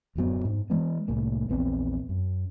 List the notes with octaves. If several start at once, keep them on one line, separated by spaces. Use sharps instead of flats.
D1 F#2 F#3 B3
G#2
E3 G#3 B3
C2 A2 A#3
A#1 E2 B3 C4
F#2